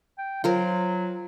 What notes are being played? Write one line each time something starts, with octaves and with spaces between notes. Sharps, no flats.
G5
F#3 F4 A#4 C5